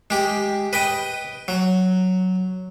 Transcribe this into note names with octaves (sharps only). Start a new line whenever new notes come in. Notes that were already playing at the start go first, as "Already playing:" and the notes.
G#3 G4
B4 D#5 G5
F#3